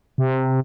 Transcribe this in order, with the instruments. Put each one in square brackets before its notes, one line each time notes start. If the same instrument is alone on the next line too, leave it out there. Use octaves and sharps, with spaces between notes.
[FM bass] C3